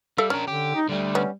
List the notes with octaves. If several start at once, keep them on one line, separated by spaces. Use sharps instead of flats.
G3 A4 E5 F5
C#4 D4 A#4
D3 G4
D#4
D3 G3 A3
B3 C#4